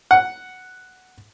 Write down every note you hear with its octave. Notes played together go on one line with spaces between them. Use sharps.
F#5